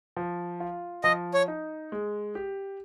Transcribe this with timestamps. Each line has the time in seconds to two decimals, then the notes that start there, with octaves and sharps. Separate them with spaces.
0.16 F3
0.60 F4
1.04 F3 D#5
1.34 C#5
1.48 D#4
1.92 G#3
2.35 G4